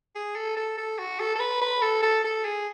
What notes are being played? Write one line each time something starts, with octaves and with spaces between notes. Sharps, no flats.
G#4
A4
A4
A4
F#4
A4
A4
B4
B4
A4
A4
A4
G#4